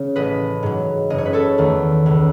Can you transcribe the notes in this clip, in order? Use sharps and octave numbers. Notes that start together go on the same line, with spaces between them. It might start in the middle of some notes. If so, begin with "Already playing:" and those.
Already playing: C#3
A1 B4 D#5
G#2 F#3
F#1 D#5
C#5
B4
A4 C#5
E2 D#3 A3
C#2